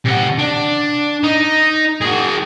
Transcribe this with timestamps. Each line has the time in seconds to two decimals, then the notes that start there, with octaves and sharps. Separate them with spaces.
0.05 C3 F#5
0.39 D4
1.24 D#4
2.01 F#4 G#4